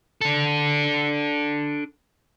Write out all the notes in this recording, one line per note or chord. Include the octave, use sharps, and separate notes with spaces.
D4 A4